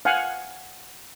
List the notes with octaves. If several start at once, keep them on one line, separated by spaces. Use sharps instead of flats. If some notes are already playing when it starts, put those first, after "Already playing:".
F5 F#5 G#5